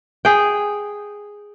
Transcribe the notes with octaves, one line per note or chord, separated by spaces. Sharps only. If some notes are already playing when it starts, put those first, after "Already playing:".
G#4 G5